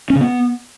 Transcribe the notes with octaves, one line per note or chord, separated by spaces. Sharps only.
C#4
C#3
B3